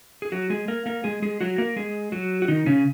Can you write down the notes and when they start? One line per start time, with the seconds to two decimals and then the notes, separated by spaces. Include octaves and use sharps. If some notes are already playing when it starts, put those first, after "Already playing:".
0.22 G#4
0.32 F#3 F#4
0.50 G#3 G#4
0.68 A#3 A#4
0.86 A#3 A#4
1.04 G#3 G#4
1.22 G#3 G#4
1.41 F#3 F#4
1.58 A#3 A#4
1.76 G#3 G#4
2.12 F#3 F#4
2.42 F#4
2.48 D#3 D#4
2.66 C#3 C#4